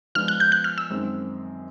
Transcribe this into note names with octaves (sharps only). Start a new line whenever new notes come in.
F3 G#3 B3 D4 F6
F#6
G6
F#6
F6
E6
F#2 D#3 G#3 C4